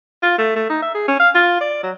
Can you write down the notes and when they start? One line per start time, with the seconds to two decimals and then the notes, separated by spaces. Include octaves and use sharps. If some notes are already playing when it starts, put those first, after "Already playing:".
0.23 F4
0.38 A3
0.56 A3
0.70 D#4
0.82 E5
0.95 G#4
1.08 C#4
1.20 F5
1.35 F4
1.61 D5
1.83 F#3